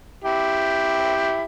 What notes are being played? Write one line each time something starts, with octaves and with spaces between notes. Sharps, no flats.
E4 G4